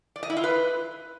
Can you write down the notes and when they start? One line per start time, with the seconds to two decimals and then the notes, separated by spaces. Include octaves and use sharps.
0.16 D5
0.23 D#5
0.30 E4
0.37 F4
0.44 B4